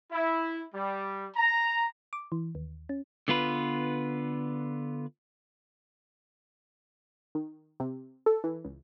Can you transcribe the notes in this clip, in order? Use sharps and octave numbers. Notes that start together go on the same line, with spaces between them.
E4
G3
A#5
D6
E3
D#2
C#4
D3 B3 F4 B4
D#3
C3
A4
E3
C#2